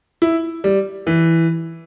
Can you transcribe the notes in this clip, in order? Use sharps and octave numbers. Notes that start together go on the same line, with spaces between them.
E4
G3
E3